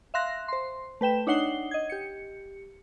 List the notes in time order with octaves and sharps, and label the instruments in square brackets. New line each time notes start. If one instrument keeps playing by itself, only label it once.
[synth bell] E5 F5 C6 F#6 A#6
C5 C6
A3 B4 G5 E7
D4 D#4 C#5 F#5 C7 G7
D#5 G#6
G4 C#7